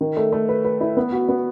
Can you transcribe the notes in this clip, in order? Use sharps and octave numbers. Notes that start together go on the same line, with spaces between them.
D#3
A3
A3
B4
B4
E4
B3
F#4
B3